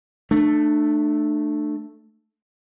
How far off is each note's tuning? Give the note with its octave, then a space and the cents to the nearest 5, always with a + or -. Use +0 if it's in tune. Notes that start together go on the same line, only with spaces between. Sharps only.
A3 +0 D4 +35